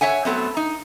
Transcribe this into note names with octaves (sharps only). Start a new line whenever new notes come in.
C#5 E5 F#5 G#5
F#3 A3 B3 C4
D#4